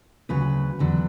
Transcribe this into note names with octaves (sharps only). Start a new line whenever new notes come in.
D2 C#3 F#3 B4
E2 D3 F#3